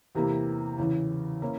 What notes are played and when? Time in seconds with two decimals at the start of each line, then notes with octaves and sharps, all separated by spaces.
0.15 E2 C3 E3 A#3 E4
0.78 E2 C#3 E3
1.42 E3 A#3 C#4 E4